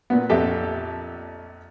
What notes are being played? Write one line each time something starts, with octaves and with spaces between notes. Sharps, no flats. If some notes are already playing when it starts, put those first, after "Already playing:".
A#2 B3
A#1 F2 G4 A4 E5